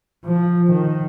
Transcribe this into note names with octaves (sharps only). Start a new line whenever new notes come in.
F3
D#3